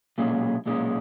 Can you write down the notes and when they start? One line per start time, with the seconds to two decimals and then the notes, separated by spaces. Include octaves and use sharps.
0.18 B1 A#2 G#3 C#4
0.66 B1 A#2 G#3 C#4